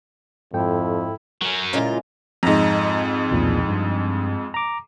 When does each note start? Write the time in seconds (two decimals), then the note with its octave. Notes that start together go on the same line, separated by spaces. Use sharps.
0.53 F2 G#2 E4 A4 G5
1.41 F#3 C#4 A#4
1.73 A#2 C#3 G#3 E4 F4
2.43 F2 G#2 D#5 A#5
3.31 B1 E2 A#2
3.69 G2
4.54 A#5 D6